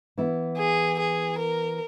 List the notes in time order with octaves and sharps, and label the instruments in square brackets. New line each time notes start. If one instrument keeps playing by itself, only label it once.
[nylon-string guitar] E3 B3 E4
[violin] G#4
G#4
A#4